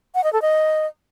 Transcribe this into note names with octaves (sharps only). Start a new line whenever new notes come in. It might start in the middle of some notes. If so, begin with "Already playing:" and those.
F#5
D#5
A4
D#5